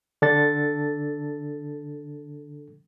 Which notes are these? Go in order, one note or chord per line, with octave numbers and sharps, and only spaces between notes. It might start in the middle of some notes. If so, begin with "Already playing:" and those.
D3 D4 A4 A6